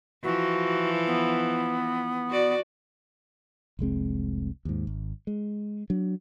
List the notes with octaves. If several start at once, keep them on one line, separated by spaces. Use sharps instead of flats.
E3 F3 F#4
B3
F#4 D5
F1 C2 G#3 C4
D#2 G#2
G#1
G#3
F#3 D4